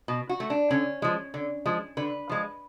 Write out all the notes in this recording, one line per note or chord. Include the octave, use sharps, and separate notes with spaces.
B2
F#4
A3
D4
D3 C#4
F3 G#3
D3
F3 G#3
D3 B4
F3 G#3